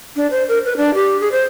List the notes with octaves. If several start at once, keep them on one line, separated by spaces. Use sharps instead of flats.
D4
C5
A#4
B4
D4
G4
G#4
C5